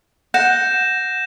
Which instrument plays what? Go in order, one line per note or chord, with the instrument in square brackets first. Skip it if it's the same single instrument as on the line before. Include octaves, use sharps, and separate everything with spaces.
[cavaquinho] F#5 [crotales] G6 A#6 E7